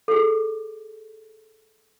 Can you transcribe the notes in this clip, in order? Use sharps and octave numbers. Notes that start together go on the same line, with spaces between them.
G#4 A4